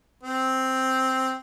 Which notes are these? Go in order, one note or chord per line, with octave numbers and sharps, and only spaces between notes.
C4